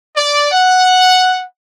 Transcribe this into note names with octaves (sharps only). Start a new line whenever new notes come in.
D5
F#5